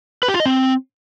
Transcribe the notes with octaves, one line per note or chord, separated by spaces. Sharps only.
B4
G4
F4
D#5
C4